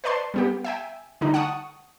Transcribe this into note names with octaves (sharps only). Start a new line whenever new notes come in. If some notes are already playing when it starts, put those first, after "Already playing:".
B4 C5 D5 A5 C6
G3 B3 G4
E5 G5 G#5
D3 G3 A3 D#4
F#5 A5 C#6 D#6